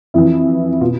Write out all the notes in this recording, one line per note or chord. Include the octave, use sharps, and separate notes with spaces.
F2 E3 E4
B2 F4